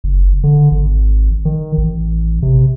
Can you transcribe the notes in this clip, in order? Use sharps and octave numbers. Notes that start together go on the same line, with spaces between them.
F#1
D3
G#1
D#3
A1
C3